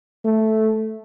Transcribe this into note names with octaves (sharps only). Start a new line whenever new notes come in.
A3